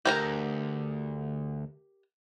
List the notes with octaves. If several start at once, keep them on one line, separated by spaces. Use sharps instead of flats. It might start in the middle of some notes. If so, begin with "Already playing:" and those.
D2 G4 A#4 A#5